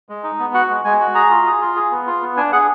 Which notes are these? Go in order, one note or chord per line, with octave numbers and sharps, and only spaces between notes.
G#3
D#4
B3
F#4 F#5
G#3
G#3 G#5
F#4
G#4 A#5
F4
G#4
F4
G#4
B3
F4
B3
D4 G#5
G#4 F#5